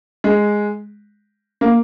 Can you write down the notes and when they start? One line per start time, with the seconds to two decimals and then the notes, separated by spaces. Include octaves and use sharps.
0.24 G#3
1.61 A#3